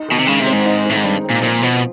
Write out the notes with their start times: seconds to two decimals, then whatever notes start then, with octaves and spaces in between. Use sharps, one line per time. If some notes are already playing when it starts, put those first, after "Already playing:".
Already playing: D#4
0.08 B2 D#3
0.19 C3
0.27 C#3 G#3
0.40 C3
0.47 C4
0.53 G#2
0.66 D#4
0.86 A2 D#3
0.97 G#2
1.04 G2 G#3
1.24 C4
1.31 A#2
1.42 A#2 F3
1.62 B2 F3